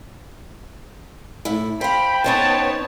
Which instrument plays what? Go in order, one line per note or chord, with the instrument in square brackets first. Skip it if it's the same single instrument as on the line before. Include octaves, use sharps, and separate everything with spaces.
[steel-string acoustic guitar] A2 E4
[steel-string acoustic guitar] C5 F5 [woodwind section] G5 [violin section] B5
[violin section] B3 C#5 A5 [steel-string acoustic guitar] C#4 D#4 C5